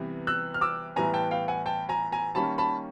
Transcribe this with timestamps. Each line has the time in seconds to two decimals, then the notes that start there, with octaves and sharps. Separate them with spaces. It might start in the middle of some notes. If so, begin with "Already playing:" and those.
Already playing: C3 E3 G3 B3
0.27 E6 F#6
0.54 F6
0.61 D6 E6
0.96 A2 E3 G3 B3 G#5 A#5
1.14 G5 A5
1.31 F5 G5
1.48 F#5 G#5
1.66 G5 A5
1.89 G#5 A#5
2.12 G#5 A#5
2.35 D#3 G3 A#3 C#4 A5 B5
2.58 A5 B5